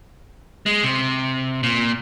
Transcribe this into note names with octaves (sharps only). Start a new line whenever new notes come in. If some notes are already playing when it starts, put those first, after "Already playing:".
G#3
C3
A#2